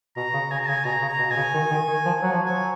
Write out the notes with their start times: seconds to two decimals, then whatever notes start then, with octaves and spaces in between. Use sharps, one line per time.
0.17 B2 A#5
0.34 C#3
0.51 C#3 G#5
0.59 A#5
0.68 C#3 G#5
0.85 B2 A#5
1.02 C#3
1.09 A#5
1.19 B2
1.30 B2 G#5
1.37 C#3
1.54 D#3
1.71 D#3
1.88 D#3
2.06 F3
2.22 F#3
2.33 F3
2.43 F#3 G#5